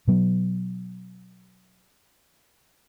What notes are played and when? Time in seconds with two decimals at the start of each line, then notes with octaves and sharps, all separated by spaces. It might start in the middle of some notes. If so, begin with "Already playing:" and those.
0.08 B2 F#3 B3